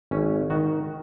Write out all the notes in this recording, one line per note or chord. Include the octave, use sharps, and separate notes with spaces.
G#1 C#4
D#3 F#4